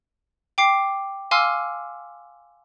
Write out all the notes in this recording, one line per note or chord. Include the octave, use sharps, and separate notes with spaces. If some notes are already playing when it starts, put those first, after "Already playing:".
G5 D6 C7
F5 G#5 C6 D6 E6 F6